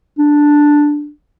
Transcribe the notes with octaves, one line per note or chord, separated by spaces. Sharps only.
D4